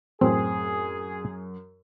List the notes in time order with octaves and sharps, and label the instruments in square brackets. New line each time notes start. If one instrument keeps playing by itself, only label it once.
[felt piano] F#2 [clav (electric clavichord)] A2 C4 [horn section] G#4